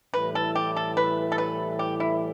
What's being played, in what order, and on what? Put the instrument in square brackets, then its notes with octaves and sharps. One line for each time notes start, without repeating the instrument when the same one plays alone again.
[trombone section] A2 E3 G3 [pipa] B4
[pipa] A4
G4
A4
B4
A4
B4
G4
E4